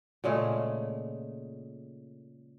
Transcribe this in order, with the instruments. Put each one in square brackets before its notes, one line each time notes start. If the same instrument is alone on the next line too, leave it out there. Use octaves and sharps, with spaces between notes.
[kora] A#2 C#3 G#3 A3